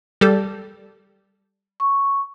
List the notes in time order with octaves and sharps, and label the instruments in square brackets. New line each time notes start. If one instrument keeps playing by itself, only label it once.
[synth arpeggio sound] G3 A4
[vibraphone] C#6